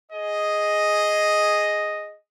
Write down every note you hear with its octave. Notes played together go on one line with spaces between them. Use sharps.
G#4 D#5